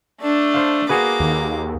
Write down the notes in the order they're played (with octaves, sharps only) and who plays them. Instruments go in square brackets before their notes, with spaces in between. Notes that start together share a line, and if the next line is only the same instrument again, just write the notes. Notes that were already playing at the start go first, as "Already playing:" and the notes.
[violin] A3 D4
[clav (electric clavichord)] C5 F5
[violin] A#3 D6 [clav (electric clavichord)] F#4 G#4 B4
[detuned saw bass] D#2